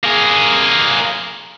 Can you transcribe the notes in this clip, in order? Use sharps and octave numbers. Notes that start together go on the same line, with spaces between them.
A#3 G#4